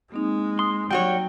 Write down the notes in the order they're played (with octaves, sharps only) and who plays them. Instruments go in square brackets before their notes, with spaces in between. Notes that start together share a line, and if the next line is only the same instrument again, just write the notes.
[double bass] G#3 [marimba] A#3 C4 D#4
[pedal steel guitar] C6 [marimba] D#6
[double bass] F#3 [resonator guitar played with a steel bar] G3 F#4 C#5 [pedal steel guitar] G5